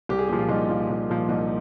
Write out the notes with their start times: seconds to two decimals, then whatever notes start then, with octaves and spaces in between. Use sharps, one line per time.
0.09 C2 G4
0.19 G#4
0.29 A#2 F3 G4
0.39 F4
0.49 C2 D#4
0.69 A#2 F3
0.90 C2
1.10 A#2 F3
1.29 C2 D#4